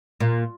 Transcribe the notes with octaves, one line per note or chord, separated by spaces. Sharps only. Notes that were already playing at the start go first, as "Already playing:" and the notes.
A#2